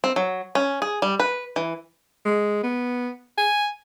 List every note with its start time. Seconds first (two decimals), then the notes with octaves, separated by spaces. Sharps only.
0.04 C4
0.16 F#3
0.55 C#4
0.82 G#4
1.02 G3
1.20 B4
1.56 E3
2.25 G#3
2.63 B3
3.37 G#5